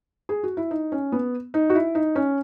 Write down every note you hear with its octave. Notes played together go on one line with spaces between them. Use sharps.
G#4
F#4
E4
D#4
C#4
B3
D#4
F#4
E4
D#4
C#4